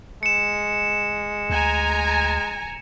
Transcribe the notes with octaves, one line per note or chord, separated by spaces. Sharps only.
G#3 C#7 E7
D2 G#5 A#5